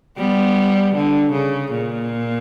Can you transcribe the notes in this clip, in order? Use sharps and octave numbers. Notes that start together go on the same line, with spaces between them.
G3 B3
D3
C#3
A#2